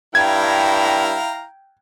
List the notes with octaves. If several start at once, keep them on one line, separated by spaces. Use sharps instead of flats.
G2 E4 F5 G5 A#5 G#6